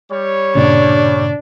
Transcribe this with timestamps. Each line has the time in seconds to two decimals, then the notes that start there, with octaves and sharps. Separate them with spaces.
0.13 G3 C#5
0.55 G2 A#2 C#3 D4